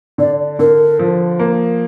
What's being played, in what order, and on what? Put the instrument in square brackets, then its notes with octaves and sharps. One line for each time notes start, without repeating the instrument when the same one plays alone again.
[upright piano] D3 [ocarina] D5
[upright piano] D3 [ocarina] A#4
[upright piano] F3
A#3